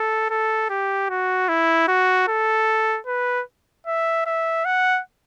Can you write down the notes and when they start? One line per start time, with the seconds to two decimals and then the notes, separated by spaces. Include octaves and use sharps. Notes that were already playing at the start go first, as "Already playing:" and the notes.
Already playing: A4
0.30 A4
0.70 G4
1.10 F#4
1.49 E4
1.88 F#4
2.28 A4
3.07 B4
3.87 E5
4.26 E5
4.65 F#5